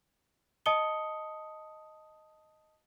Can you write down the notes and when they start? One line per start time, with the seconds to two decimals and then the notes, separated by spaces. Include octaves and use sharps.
0.66 D#5 A5 D#6 C#7 G7